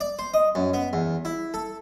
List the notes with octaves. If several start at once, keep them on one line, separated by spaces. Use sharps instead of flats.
D5
C5
D#5
F#2
B3
E2
E4
A4